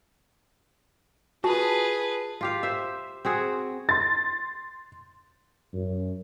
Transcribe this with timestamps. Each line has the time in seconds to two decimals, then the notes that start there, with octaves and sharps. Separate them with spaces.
1.44 F4 F#4 G#4 B4 A5
2.41 F4 G4 F5
2.63 C5 E5
3.25 C4 F#4 G#4
3.89 C6 A6
5.74 F#2